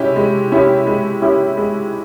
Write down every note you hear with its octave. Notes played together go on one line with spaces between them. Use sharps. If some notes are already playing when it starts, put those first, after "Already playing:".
Already playing: G#3 C#4 E4 G4
G#3
C#4 E4 G4
G#3
C#4 E4 G4
G#3